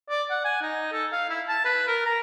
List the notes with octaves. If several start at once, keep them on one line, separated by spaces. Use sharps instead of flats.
D5
F#5
G#5
D#4
A4
F5
E4
A5
B4
A#4
A#5